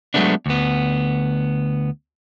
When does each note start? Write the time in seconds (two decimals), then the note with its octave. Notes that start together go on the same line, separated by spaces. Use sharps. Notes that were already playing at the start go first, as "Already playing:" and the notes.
0.14 F#3 G#3 A3 B3 D4
0.46 D2 B3